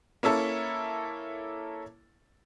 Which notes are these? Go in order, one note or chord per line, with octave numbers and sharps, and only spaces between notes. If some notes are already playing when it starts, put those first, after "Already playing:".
A#3 C#4 E4 A4